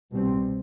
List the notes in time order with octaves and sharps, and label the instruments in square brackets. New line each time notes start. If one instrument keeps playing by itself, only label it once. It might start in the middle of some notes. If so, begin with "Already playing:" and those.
[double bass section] C2 B2 G3 C4